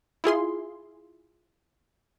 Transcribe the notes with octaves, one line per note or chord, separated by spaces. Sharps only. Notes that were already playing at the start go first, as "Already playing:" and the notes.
E4 F4 G#4 C6